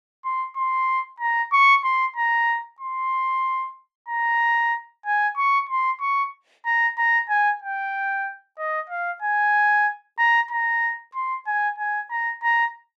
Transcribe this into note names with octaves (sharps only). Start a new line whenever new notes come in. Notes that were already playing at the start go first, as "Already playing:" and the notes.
C6
C6
A#5
C#6
C6
A#5
C6
A#5
G#5
C#6
C6
C#6
A#5
A#5
G#5
G5
D#5
F5
G#5
A#5
A#5
C6
G#5
G#5
A#5
A#5